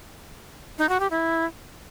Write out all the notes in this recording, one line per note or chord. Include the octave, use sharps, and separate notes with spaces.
D#4
F#4
G4
E4